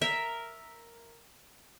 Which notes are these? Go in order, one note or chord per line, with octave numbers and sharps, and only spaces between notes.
A#4 E5